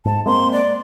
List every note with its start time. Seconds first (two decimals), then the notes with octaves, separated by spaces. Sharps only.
0.05 G#2 A5
0.26 G#3 A#3 C4 C6
0.52 D5